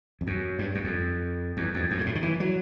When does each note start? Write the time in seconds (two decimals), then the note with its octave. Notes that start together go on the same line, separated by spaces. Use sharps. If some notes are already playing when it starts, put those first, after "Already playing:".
0.21 F2
0.27 F#2
0.59 G2
0.75 F#2
0.84 F2
1.57 E2
1.74 F2
1.91 F#2
1.99 G2
2.06 A2
2.15 D#3
2.23 E3
2.40 F#3